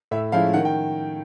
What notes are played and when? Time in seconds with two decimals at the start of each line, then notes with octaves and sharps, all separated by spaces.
0.11 A2 E5
0.32 F3 G#3 C#4 E4 F5
0.53 D#3 F#5
0.65 G5